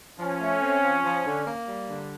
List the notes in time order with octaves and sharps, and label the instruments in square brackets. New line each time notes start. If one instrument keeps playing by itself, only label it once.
[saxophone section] F3 [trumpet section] C#4
[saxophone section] A3
C4
F3
F3
D3
A#3
G3
D3